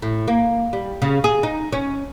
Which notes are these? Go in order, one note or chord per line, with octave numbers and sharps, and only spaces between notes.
A2
A#3
G3
C#3
G#4
D#4
C#4